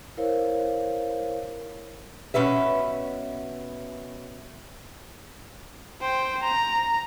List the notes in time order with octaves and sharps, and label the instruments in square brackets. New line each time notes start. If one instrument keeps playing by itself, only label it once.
[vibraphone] E4 A#4 C5 C#5 F5
[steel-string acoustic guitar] B2 C#4 B4 E5
[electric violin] C5 G5
A#5